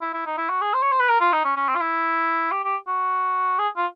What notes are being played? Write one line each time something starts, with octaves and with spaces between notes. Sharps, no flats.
E4
E4
D#4
E4
F#4
G#4
C5
C#5
C5
B4
A#4
F4
D#4
C#4
C#4
C4
F4
E4
G4
G4
F#4
G#4
F4